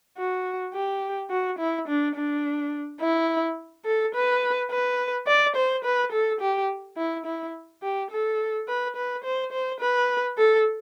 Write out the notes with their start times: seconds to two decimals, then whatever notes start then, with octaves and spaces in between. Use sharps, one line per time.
0.18 F#4
0.74 G4
1.30 F#4
1.59 E4
1.88 D4
2.16 D4
3.01 E4
3.86 A4
4.15 B4
4.71 B4
5.27 D5
5.56 C5
5.85 B4
6.12 A4
6.41 G4
6.97 E4
7.26 E4
7.83 G4
8.11 A4
8.68 B4
8.96 B4
9.24 C5
9.52 C5
9.81 B4
10.38 A4